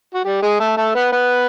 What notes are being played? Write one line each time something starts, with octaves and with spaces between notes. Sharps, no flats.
F#4
G3 G4
G#3 G#4
A3 A4
A3 A4
B3 B4
B3 B4